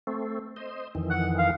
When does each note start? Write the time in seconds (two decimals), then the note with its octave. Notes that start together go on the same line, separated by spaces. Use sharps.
0.07 A3 C4
0.56 C5 D#5
0.95 F2 D#3 E3
1.10 F#5
1.38 F5